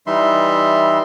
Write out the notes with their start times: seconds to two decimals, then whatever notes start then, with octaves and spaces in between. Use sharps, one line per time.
0.07 E3 G3 D#4 E5 C6